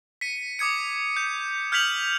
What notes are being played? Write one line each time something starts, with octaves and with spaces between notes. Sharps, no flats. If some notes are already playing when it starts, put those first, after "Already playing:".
B6 C#7 D#7
D6 D#6 G#6 C#7
G6
F6 G6 G#6 B6 F7 F#7